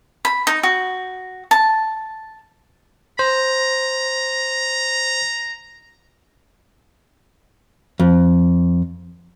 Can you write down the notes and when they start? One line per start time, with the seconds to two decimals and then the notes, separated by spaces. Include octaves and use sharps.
0.25 B5
0.47 D#4
0.63 F#4
1.51 A5
3.19 C5 A#5
8.00 F2